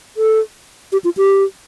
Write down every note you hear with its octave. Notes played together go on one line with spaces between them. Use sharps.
A4
G4
F4
G4